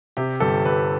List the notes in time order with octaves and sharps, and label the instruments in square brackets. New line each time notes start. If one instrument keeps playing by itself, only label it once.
[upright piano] C3 [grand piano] G4
[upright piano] G1 [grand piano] A4
[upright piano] G1 [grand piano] B4